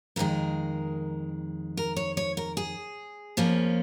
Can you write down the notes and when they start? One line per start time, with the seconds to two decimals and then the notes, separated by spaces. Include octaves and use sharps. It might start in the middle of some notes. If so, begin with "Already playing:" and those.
0.16 F2 D#3 G#3 A#4
1.77 A#4
1.96 C#5
2.17 C#5
2.37 A#4
2.57 G#4
3.37 F2 F3 A#3 C#4